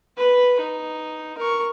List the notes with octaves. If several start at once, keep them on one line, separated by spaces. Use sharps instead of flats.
B4
D#4
A#4 C#6